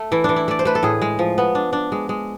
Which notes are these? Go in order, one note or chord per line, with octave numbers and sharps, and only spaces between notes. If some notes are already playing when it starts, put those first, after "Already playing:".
Already playing: A3
E3 E4
E3 D4
E4
A3 D5
C5
A3 B4
A4
A2 G#4
G#3
F3
B3
D4
D4
G#3
G#3